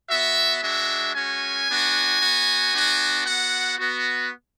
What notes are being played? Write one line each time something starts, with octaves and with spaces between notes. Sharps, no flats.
B3 F#4 E5
G#3 D4 F#4 E5
G#3 C#4 F#4 G#5
B3 D4 F#4
B3 F#4
B3 D4 F#4
B3 F#4 F#5
B3 F#4